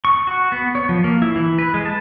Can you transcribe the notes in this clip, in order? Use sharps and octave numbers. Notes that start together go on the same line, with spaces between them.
C#6
F#4
B3
C#5
F3
A#3
E4
E3
B4
G#3
A5